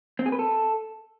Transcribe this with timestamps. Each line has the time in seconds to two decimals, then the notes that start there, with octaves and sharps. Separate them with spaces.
0.19 C4
0.26 G#4
0.32 B4
0.39 A4